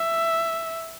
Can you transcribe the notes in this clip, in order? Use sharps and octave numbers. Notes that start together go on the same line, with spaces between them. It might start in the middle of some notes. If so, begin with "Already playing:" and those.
Already playing: E5